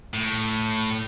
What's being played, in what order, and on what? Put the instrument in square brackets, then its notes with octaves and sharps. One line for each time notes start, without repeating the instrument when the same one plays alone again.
[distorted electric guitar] A2